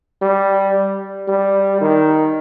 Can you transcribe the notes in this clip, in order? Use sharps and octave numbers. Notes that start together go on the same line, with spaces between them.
G3
G3
D#3